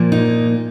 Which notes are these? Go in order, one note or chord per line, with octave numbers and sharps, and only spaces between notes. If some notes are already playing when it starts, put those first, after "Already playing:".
Already playing: A#2 F3 A#3
D#4